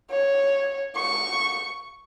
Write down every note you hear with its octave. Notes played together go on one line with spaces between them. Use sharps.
C#5
C#6